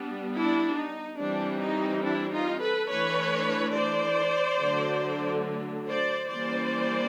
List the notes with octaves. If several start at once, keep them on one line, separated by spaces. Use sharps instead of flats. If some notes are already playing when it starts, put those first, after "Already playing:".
Already playing: G3 B3 D4
D4 E4
D#4
E3 G3 C4 D4
D#4
D4 E4
D#4 F4
A4 B4
E3 A3 D4 B4 C#5
C5 D5
D3 F#3 A3 D4
C5 D5
E3 G3 A#3 C#4 C5 D5